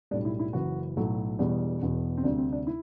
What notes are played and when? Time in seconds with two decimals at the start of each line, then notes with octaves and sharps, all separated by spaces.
0.11 B1 A2 G3 D4
0.25 E4
0.39 E4
0.53 F#1 F#2 E3 F#4
0.97 B1 A2 F#3 A3
1.39 E1 E2 B2 G3
1.82 E1 E2 B2
2.17 C4
2.24 D2 C3 G3 D4
2.38 C4
2.52 D4
2.67 E4